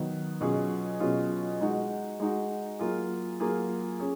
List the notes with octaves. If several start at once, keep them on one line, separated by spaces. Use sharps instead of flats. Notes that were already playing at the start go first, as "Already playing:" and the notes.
Already playing: D#3 F#3 B3
B2 F#3 C#4 F4 G#4
B2 F#3 C#4 F4 G#4
G#3 D#4 F#4
G#3 D#4 F#4
F#3 A#3 F4 G#4
F#3 A#3 F4 G#4
C#4 G#4